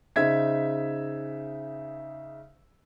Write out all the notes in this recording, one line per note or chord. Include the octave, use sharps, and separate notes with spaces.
C#3 D#4 C5 E5 G#6 B6